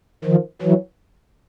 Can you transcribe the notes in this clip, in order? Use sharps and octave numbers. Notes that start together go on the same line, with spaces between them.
D#3 F3
E3 F#3